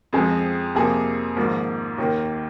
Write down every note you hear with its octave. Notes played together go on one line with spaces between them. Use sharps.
F2 F3 G#3 C4 G#4
F2 C3 F3 A#3 G#4
G#1 G#2 F3 A#3
D#2 D#3 A#3